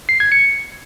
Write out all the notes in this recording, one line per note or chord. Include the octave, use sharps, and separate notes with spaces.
C7
G#6
C#7